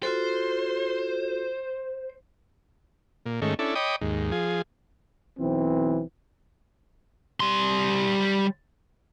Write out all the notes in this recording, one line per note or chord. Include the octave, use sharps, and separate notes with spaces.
F4 F#4 A4 C5
A#2
G#2 D#3 A3 C#4
C#4 D4 E4 A4
C#5 D#5 G5 B5 D6 D#6
D#2 G#2
F3 G#4
B1 E3 C4
G3 C6